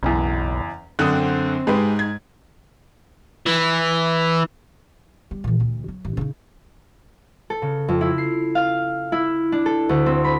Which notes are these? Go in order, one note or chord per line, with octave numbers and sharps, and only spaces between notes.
F#1 B1 E2
F#2 D3 C4 D#6 F#6
G#2 G#3 G4 B4
G#6
E3
G3
A#2 E3
D2
F#3
A1
C#3 D#4
A4
C#3
F2
E4
C7
F5
E4
D4
A4
D2
C4
B5